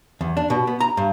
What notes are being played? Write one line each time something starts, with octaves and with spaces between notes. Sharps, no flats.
E2
D4
B2
B3
A#5
G2